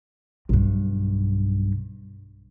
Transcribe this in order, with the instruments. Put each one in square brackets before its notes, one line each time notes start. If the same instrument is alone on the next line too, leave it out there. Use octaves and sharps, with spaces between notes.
[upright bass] B1 G2